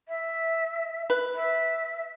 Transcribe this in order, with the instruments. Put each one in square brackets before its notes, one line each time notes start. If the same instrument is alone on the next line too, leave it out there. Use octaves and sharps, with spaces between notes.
[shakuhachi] E5
[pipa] B4
[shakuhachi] E5